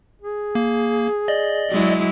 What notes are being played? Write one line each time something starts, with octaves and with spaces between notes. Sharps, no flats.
G#4
A#3
D5 D#5
F#3 G#3 E4